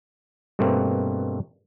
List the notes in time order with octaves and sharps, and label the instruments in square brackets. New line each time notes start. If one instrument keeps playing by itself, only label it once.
[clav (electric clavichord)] G2 B2 A3 A#3 C4